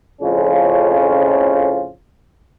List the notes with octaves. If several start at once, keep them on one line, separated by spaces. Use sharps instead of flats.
F2 A2 C#3 F3 C#4 F4